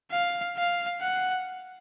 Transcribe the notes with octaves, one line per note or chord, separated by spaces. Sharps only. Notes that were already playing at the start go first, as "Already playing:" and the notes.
F5
F5
F#5